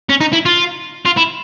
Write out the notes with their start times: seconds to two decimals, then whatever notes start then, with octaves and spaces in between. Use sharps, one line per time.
0.09 C#4
0.21 D#4
0.33 E4
0.45 F4
1.05 F4
1.17 E4